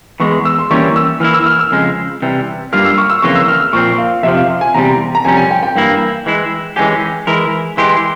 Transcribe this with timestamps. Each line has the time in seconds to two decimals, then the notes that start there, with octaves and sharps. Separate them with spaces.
0.20 E2 E3 G#3 C#6
0.45 E6
0.59 C6
0.71 E3 G3 A#3 C#4 C#6
0.96 E6
1.20 E3 A#3 E4 F6
1.33 E6
1.46 F6
1.59 E6
1.71 F2 C#3 F3 G#3
2.22 C3 E3 G3
2.73 G2 G3 A#3 F4 F6
2.85 E6
2.98 C#6
3.10 E6
3.22 F2 C#3 E3 A#3 F4 C#6
3.36 E6
3.48 F6
3.60 E6
3.73 A#2 F3 C4 C#6
3.98 F5
4.23 F2 C3 F3 E5
4.37 F5
4.49 F5
4.61 G#5
4.74 E2 C3 G3 A#5
5.15 A#5
5.25 F2 C3 G3 C#4 G#5
5.37 G#5
5.51 G5
5.63 G5
5.76 G2 E3 A#3 E4
6.26 E3 G#3 E4
6.76 E3 G#3 C#4 G4 G#5
7.27 E3 G#3 E4 A#4
7.77 E3 G#3 E4 G4 C6